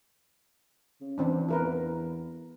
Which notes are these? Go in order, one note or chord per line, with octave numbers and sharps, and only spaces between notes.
C#3
E3 C4 D4
E2 E4 A#4 B4